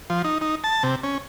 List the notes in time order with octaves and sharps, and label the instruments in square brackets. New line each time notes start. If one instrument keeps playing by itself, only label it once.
[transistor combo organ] F3
D#4
D#4
A5
C3
C#4